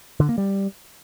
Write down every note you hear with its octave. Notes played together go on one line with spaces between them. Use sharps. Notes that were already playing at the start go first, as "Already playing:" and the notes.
D3
A#3
G3